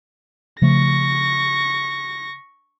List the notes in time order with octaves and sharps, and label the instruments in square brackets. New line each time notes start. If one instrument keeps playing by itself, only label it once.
[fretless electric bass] C#3 F3 A3 [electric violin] C#6 A#6